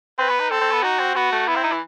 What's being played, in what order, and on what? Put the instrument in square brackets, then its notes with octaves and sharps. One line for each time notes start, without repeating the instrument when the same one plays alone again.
[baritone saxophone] C4 [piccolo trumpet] B4
[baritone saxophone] B3
D#4
[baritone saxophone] C4 [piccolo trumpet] A4
[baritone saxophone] C4
B3
[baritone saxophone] D#4 [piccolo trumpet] F#4
[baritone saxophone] C4
[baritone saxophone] B3 [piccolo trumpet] F#4
[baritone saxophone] A3
[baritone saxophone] B3 [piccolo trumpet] E4
[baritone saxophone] C4
D#4
E3